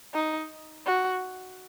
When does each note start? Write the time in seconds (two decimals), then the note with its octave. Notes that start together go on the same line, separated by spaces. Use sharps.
0.14 D#4
0.86 F#4